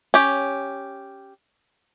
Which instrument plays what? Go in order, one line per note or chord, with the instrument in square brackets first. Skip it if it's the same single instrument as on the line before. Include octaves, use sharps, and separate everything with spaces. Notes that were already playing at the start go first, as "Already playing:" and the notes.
[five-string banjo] C#4 G4